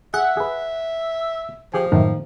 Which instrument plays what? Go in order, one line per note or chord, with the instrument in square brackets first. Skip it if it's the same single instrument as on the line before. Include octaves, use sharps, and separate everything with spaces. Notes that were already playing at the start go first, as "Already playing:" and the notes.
[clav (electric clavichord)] G#4 [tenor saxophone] E5 [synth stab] F#5
[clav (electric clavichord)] G#4 B4
[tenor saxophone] F3 [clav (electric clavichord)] G4 G#4 G#5
[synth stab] F#2 A2 [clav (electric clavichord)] D#3 A#3